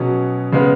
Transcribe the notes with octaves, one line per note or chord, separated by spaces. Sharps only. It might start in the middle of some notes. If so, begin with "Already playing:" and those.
Already playing: B2 F#3 C#4 G#4
C#3 G#3 B3